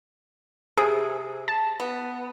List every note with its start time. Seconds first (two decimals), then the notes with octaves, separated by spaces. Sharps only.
0.77 C3 G#4
1.48 A5
1.80 B3